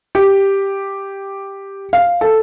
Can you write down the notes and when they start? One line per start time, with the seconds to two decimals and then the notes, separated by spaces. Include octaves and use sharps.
0.15 G4
1.93 F5
2.21 A4